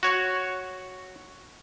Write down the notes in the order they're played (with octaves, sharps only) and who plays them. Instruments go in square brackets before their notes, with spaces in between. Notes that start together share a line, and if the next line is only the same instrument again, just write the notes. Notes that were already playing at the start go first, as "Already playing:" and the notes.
[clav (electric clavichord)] F#4 C#5